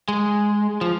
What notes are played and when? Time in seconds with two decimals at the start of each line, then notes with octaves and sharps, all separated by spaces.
0.08 G#3
0.81 F3